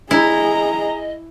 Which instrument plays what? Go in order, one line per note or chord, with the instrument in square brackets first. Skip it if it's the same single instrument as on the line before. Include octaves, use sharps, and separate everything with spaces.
[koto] E4 [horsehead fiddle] G#4 A#5 [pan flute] D#5